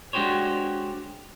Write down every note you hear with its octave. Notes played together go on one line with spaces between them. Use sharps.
G#3 D4 F#4 G4 C5 C#5